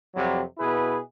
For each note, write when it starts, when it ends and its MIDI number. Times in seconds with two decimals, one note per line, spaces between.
0.15 0.41 41
0.15 0.41 48
0.15 0.41 54
0.15 0.41 55
0.58 0.97 47
0.58 0.97 64
0.58 0.97 68
0.58 0.97 71